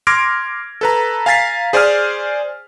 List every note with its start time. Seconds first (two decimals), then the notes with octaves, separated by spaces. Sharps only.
0.07 C6 D6 F6 G#6 A#6 D7
0.81 A4 B4 A#5
1.26 F5 G#5 A#5 A6 B6 C7
1.73 G#4 C5 D5 G#5 D#6 F6